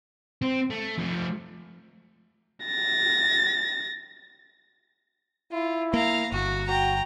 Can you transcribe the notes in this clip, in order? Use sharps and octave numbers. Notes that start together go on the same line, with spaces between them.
C4
A3
F3 A3
A6 A#6
E4 F4
A#3 F5 A#5
G1 F#4
F#4 G5 A#5